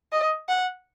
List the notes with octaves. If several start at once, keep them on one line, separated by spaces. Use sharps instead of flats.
D#5
F#5